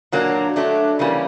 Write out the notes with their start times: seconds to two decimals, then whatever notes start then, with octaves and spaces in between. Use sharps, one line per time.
0.12 A#2 F#3 A#3 D4
0.56 F#3 A3 D4
0.99 C#3 E3 G3 A#3 C#4